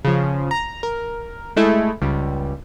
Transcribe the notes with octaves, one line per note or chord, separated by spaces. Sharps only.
C#3 F3
A#5
A#4
G#3 A3 E4
C#2 G3